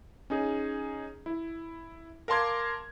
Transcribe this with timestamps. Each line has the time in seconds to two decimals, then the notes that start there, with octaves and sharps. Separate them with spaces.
0.30 C#4 D#4 G#4
1.26 E4
2.28 A#4 F5 A5 C6 D6 G#6